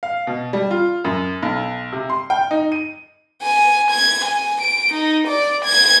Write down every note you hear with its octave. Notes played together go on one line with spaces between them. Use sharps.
F5
B2
G3
F4
F#2
B1
C3
C6
G5
D#4
D#7
G#5
G#6
G#5
D7
D#4
D5
G#6